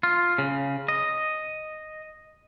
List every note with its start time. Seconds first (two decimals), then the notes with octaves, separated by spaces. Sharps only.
0.03 F4
0.38 C#3
0.88 D#5